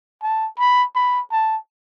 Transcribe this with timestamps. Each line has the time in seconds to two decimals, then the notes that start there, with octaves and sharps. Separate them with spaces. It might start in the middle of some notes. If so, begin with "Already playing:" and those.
0.22 A5
0.59 B5
0.95 B5
1.31 A5